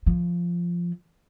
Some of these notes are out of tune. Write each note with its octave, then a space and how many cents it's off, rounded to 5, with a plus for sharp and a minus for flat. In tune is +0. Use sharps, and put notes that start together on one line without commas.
F3 -5